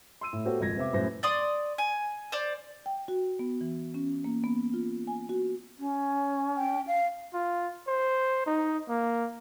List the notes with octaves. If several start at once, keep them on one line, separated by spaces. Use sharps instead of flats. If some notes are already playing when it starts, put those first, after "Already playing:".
C6 E6 D#7
A2
B3 F#4 G4 A4 C5 C#5
G#1 F2 A#2 G#6 A#6
C3 B3 C4 E5 D6
F#2 A2 B4 C5 A#6
D5 C6 D#6
G#5
C5 D5
G5
F#4
B3
E3
C#4
A#3
B3
F4
G#5
F#4
C#4
G5
F5
F4
C5
D#4
A#3